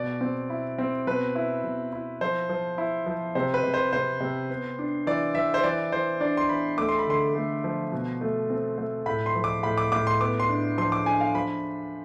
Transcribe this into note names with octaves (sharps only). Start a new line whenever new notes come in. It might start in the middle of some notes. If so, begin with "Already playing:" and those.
Already playing: B2 D5
C4
E4
C4
B2 B4
E4
B2
E4
F3 C5
F3
E4
F3
C3 C5
B4
C3
C5
C3 C5
C3
B3
D4
E3 D5
E3 E5
C5
E3 D5
E3 C5
D4 D5
C6
E3 B5
A3 D6
C6
B5
D3 C6
A3
F3
B2
A3
C4
A3
A2 B5
C6
F3
D6
A2 B5
D6
A2 D6
C6
B3 D6
C6
D4
F3 C6
D6
D4 G#5
F5
F3 B5